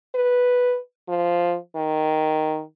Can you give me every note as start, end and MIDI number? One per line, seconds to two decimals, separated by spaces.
0.15 0.78 71
1.09 1.56 53
1.76 2.62 51